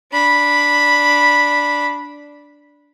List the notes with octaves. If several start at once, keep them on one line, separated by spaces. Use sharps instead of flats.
D4 B5